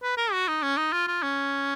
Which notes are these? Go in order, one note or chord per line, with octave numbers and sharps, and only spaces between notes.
B4
A#4
F#4
D#4
C#4
D#4
F4
F4
C#4